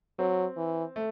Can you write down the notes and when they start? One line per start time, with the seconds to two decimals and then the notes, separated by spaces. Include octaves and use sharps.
0.19 F#3 C4
0.57 E3
0.96 A3